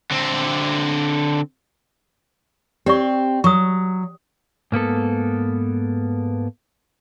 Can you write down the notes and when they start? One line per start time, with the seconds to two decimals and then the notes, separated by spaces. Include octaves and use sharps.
0.11 D3 C4
2.86 C4 G4 D5 C#6
3.44 F#3 C#6 D#6
4.72 G#2 A#3 B3 A4